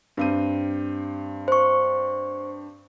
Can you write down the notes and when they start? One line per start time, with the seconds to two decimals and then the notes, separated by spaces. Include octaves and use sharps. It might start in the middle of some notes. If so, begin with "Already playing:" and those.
0.17 G2 C4 D#7
1.48 C5 C#6